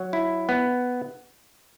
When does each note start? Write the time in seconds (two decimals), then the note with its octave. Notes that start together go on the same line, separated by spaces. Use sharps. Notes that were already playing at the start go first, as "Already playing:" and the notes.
Already playing: F#3
0.13 E4
0.49 B3